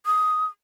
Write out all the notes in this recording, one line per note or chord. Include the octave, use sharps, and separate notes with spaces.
D#6